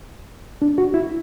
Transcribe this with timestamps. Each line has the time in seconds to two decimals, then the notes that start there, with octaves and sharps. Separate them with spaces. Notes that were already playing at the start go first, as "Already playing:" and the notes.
0.62 D4
0.78 F#4
0.94 E4